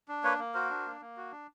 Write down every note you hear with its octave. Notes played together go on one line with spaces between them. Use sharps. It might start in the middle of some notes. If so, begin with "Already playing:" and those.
D4
A#3 B4 C#5
A#3
F#4 A#4 C5
D4
A#3
A#3
F#4
D4